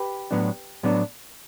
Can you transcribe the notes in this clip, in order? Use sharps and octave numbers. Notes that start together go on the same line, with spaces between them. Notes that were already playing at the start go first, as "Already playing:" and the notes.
Already playing: G4 B4
A2 F#3 B3 D4
A2 F#3 B3 D4